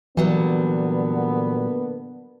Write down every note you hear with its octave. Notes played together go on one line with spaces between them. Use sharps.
A#2 D3 E3 F#3 G3 A#3 B3